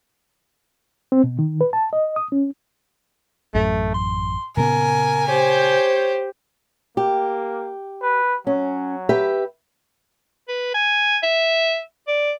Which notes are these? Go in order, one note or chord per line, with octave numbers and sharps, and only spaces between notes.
C4
B2
D#3
B4
A5
D#5
D#6
C#4
A1 F#2 A3
C6
A#2 C#3 B3 A#4 G#5
G4 C5 C#5
A#3 G4
B4
F#3 C#4
G4 B4 E5
B4
G#5
E5
D5